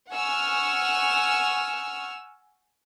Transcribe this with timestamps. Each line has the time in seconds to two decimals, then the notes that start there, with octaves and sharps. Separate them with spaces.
0.11 F#5 G#5 C#6 E6 F6